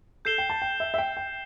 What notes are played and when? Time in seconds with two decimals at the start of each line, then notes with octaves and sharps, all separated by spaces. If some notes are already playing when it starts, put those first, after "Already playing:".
0.25 A4 G6 C7 E7 G7
0.38 G5
0.50 A5
0.62 G5
0.80 E5
0.94 E5
0.98 G5
1.17 G5